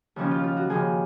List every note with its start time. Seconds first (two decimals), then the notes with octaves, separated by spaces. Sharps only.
0.16 D#2 C#3 F3 C#4
0.31 F4
0.44 F4
0.57 F#4
0.70 D#2 C#3 F3 G#4